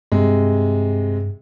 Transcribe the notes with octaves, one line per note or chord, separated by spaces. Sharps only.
G2 C3 G#3